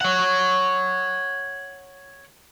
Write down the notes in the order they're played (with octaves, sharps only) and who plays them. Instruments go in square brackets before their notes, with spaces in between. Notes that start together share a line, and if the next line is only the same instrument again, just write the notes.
[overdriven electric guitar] C#5 F#5